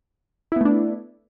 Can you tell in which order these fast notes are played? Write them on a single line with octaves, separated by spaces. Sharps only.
E4 B3 A3 D4